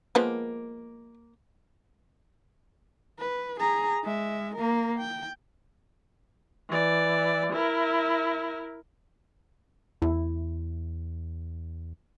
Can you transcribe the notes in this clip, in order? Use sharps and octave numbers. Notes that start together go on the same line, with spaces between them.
F3 G#3 A#3 B3
B4
G#4 A#5
G#3 E5
A#3 A#4
G5
E3 D5
E4 A#4
E2 E4